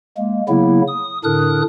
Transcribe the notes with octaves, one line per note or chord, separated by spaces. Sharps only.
G#3 A#3
C#3 F#3 A#3 B3 E4
D#6
A2 D3 D4 A#4 D#6 F#6